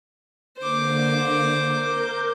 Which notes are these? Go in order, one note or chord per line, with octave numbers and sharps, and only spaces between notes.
D3 A#3 C5 D6
A#4 G6